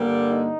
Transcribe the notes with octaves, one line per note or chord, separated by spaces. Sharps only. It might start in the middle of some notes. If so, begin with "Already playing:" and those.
Already playing: G2 D3 G3 A#3
D#4